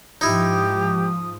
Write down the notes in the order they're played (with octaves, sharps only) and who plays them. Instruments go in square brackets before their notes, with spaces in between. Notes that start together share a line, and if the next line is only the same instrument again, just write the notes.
[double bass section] G#2 F3 [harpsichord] D#4 E4 [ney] G4 [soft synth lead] D#6